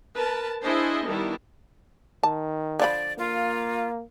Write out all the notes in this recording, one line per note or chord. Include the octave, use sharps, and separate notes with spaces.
A#4 B4 A5
D4 E4 G#4 C5 D#5 G#5
D#3 G3 B3 D4 E4
D#3 A5
D3 F3 D5 B5
A#3 F4